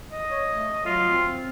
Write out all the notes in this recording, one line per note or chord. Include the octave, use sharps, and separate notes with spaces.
D#5
C#5
A3
F#3 F4
C4